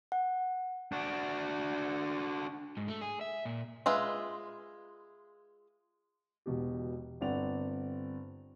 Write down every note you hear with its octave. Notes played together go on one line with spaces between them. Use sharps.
F#5
D4 F#4
G#2
A3
G#4
E5
A#2
G#3 F4 B4 E5
E1 B2 G4
G1 C4 D5 F#5 F7